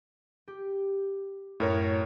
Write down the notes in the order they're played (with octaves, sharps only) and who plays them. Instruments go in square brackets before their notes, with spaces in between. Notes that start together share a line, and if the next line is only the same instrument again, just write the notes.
[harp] G4
[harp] F#2 [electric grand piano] A2 A#4 C#5